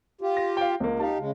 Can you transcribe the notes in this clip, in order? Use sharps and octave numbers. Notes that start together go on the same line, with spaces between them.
F4 G4
A#6
F5 G5
C#2 A#3
D#4 G4 F5 A5
C#3 G#3